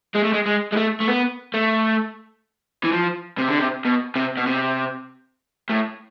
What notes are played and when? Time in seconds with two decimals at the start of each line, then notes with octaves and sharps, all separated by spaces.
0.15 G#3
0.24 A3
0.34 G#3
0.46 G#3
0.72 G#3
0.77 A3
1.00 A3
1.08 B3
1.54 A3
2.84 E3
2.93 F3
3.38 C3
3.49 D3
3.59 C3
3.85 B2
4.16 C3
4.37 B2
4.47 C3
5.69 A2